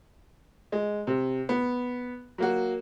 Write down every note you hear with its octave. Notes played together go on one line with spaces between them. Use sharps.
G#3
C3
B3
F#3 A#3 F#4